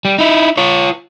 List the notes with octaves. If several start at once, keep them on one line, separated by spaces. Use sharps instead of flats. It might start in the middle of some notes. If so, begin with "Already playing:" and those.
G3
D#4 E4
F4 C#5